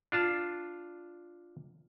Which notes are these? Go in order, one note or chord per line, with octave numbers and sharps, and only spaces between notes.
D4 F4 A5